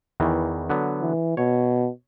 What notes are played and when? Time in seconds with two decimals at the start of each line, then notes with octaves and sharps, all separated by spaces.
0.20 E2 D#3 E3
0.70 D3 F#3 B3
1.01 E3
1.37 B2 C#5